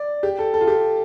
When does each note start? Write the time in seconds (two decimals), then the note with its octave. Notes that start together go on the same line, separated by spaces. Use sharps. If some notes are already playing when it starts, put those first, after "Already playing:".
Already playing: D5
0.23 G4
0.39 A4
0.54 A4
0.61 F4
0.68 G4